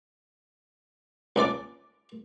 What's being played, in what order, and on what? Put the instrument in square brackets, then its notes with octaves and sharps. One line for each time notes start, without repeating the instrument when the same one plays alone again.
[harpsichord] C#2 D4 D5 D6